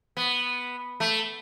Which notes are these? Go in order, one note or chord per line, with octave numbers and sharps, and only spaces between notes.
B3
A3